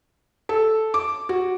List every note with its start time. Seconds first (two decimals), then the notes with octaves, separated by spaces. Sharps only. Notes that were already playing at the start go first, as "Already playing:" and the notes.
0.49 A4
0.94 D6
1.29 F#4